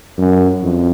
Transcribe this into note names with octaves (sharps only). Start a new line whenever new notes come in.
F#2
F2